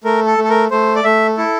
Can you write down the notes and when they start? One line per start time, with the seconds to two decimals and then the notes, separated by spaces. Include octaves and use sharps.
0.04 A3 A#4
0.26 A4
0.38 A3
0.44 A4
0.49 A#4
0.71 A3 C5
0.96 D5
1.04 A3 E5
1.37 E4 A4